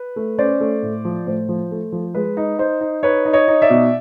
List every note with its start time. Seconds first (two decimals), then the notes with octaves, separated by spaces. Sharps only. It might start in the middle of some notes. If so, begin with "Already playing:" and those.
Already playing: B4
0.16 A3
0.38 C#4 C5 D5
0.60 A3
0.82 A2
1.05 F3
1.26 A2 C5
1.49 F3
1.71 A3
1.92 F3
2.15 G#3 B4
2.37 D#4
2.59 D#4 C5
2.81 D#4
3.03 D#4 B4 C#5
3.25 D#4
3.33 C#5 D#5
3.48 D#4
3.62 D5 E5
3.70 B2